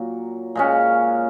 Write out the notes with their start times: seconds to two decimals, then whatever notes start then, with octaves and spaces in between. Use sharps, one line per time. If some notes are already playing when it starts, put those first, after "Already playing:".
Already playing: A#2 F#3
0.55 A#2 G#3 C#4